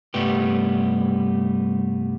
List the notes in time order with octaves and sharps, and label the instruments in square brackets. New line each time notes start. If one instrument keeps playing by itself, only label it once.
[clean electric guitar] C2 G2 G3 A3 B3 G4